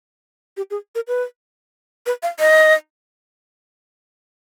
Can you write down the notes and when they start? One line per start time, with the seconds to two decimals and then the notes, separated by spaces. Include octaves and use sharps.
0.57 G4
0.70 G#4
0.95 A#4
1.08 B4
2.06 B4
2.23 F5
2.40 D#5